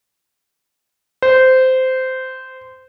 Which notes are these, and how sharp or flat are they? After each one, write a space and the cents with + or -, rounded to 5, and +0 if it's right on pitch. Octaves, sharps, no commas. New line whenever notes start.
C5 -15